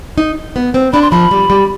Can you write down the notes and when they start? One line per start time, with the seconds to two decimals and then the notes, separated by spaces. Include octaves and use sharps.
0.18 D#4
0.56 B3
0.74 C4
0.93 D4 B5
1.02 C6
1.11 F3 B5
1.31 G3
1.50 G3